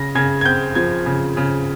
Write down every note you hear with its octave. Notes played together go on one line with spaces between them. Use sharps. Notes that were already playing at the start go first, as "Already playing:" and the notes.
Already playing: C#3 A#6
C#3 G#6
G#6
C4 G6
F3 G#6
C#3
C#3